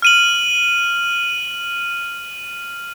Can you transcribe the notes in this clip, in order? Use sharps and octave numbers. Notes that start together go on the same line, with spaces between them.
F6 D#7 F#7